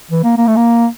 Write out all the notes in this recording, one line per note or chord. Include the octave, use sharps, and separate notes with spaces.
E3
A#3
A#3
A3
A#3